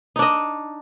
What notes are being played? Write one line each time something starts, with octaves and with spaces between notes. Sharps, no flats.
D4 D#4 D#5